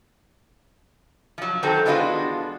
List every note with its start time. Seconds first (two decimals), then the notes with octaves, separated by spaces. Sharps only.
1.38 F3 F#3
1.63 D#3 F#3 C4 F#4 A4
1.86 E3 G#3 B3 D4 F4 F#4